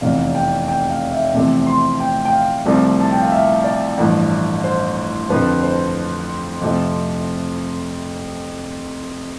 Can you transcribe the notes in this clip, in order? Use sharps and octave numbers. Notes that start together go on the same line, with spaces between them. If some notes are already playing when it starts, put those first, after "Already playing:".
F1 E2 C3 F5
G5
G5
F5
E5
E2 C3 F3 A3
C6
G5
G5
F5
C2 C3 F3 A3
A5
G5
F5
E5
D5
A1 G2 F3 A3
C5
F2 D3 F3 B4
C5
F2 C3 F3 A3